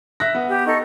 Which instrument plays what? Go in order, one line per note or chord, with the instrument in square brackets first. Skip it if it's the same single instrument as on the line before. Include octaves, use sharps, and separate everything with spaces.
[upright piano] E5 F#6 A#6
B3
[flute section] G4
D#4 A4 C#6